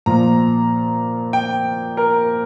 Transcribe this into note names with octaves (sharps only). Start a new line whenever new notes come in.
A#2 F3 A#3 A#5
G5
A#4